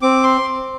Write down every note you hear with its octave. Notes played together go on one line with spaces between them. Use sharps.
C4 D6
C6